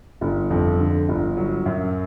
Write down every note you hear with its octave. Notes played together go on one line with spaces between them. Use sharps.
G1
F2
D3
G1
F#3
F#2